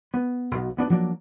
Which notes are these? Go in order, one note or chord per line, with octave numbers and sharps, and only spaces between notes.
B3
B1 B2
D2 B3 D4
F3 F#3 A#3 D4